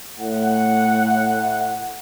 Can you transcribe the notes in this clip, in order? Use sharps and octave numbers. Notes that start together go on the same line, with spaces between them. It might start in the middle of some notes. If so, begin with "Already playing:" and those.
A2 F#5